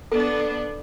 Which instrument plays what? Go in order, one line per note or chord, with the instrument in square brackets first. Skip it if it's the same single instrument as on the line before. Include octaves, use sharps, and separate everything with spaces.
[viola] B3 D4 [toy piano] A4